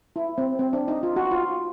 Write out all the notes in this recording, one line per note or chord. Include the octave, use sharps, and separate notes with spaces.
E4
C4
C4
D4
D#4
F4
F#4
F4